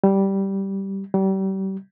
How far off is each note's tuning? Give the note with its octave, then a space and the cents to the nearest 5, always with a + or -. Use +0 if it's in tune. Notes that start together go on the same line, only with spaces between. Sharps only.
G3 -10
G3 -35